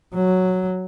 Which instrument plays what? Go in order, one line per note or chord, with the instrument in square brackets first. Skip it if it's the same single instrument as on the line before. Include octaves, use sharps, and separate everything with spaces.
[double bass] F#3